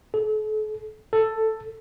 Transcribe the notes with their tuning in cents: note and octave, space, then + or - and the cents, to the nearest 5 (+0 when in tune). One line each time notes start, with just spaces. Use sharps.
A4 -40
A4 +10